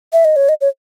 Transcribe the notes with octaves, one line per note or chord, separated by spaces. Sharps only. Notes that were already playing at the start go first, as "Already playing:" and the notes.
E5
D#5
C#5
D#5
C#5